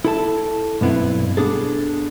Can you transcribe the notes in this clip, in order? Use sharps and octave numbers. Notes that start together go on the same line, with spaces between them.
E4 A4 A5
B1 G2 B3 C4 E4
B3 D4 G#4 A4